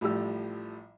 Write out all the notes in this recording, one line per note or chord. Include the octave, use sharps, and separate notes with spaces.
A1 A2 F3 G3 G4 E6